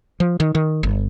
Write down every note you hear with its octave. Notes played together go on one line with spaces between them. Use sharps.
F3
D#3
D#3
G1